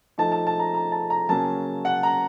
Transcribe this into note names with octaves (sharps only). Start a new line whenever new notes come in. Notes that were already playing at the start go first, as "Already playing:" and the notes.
F3 A3 D#4 A5
A5
A5
A#5
A#5
A5
A#5
C#3 F#3 A#3 C#4 A5
F#5
A#5